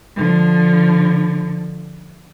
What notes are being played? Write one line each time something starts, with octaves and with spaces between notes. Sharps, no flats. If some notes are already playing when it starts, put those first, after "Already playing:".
D3 F3